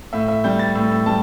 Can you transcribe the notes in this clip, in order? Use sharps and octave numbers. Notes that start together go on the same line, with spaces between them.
A2 E5
E5
G3 G6
A6
A2 E6
E6
G3 A5